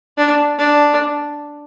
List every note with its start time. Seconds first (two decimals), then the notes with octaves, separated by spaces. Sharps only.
0.18 D4
0.58 D4